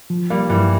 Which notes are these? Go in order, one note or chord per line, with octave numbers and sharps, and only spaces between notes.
F3
G3 A#3
G2 E3 G3